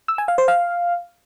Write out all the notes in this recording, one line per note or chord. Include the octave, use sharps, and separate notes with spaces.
E6
G#5
F5
C5
F5